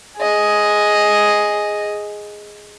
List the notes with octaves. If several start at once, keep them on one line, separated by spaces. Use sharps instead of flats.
G#4 D#5